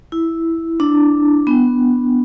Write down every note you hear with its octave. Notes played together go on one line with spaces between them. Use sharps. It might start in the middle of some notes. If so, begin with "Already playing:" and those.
E4
D4
B3